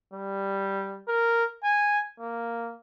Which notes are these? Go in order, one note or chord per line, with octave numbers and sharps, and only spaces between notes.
G3
A#4
G#5
A#3